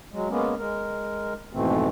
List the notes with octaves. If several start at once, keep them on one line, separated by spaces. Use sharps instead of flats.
F#3 G#3
G#3 A#3 B3 C#4
G#3 A#4
F2 G#2 B2 E3 A3 C4